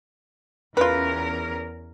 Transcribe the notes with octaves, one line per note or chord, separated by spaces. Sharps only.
E2 C#4 F4 A#4 B4